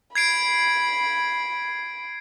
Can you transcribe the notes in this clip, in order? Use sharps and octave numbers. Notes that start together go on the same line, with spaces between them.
B5 G#6 C7 D7